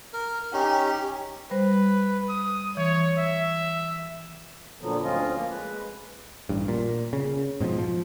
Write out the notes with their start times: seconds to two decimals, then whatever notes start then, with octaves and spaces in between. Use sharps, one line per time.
0.13 A#4
0.53 C#4 D#4 G4
1.51 G3 B4 C5
2.29 D#6
2.77 E3 C#5
3.18 E5
4.81 A#2 D3 F3 F#3 B3
5.03 D2 C4 C#4 F4 D#5
5.35 F3 A#3
5.50 G#3 B4
6.49 A1 G2
6.68 A#2
7.13 C#3
7.60 G#2 B2 D#3 F3
7.78 F3